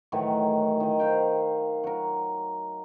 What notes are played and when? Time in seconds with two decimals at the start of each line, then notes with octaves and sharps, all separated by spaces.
0.12 A2 D#3 E3 F#3
0.80 D#3 D#5
0.99 C5 F5 G5
1.84 F#3 A#4